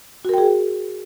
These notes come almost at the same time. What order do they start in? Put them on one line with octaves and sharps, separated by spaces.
F#4 A#4 G5 G#4